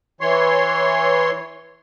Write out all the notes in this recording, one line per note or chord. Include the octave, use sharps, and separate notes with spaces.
E3 C#5 C6